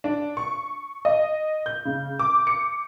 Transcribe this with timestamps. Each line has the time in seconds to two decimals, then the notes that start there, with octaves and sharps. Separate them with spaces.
0.04 D4
0.37 C#6
1.05 D#5
1.66 G6
1.85 C#3
2.19 D6
2.47 C#7